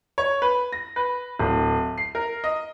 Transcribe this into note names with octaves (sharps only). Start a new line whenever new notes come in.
C#5
B4
A#6
B4
D1
C7
A#4
D#5